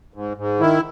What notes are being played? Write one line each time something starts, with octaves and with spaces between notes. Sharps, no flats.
G#2
G#2
D#3 E4